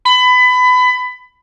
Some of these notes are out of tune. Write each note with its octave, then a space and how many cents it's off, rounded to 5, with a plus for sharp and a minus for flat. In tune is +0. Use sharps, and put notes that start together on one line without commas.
B5 +25